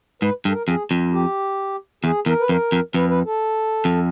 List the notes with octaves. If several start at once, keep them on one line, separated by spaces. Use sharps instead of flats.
G#2 B4
G2
A4
A#4
F2 G#4
F2
G4
E2 G#4
E2 A#4
B4
F2 A#4
F2
F2 B4
B4
A4
F2